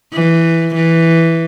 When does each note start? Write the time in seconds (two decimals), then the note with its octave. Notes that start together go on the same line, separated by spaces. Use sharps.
0.13 E3
0.75 E3